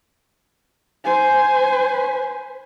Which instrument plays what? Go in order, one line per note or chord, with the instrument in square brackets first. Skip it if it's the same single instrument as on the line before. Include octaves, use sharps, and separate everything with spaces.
[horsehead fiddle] C5 G#5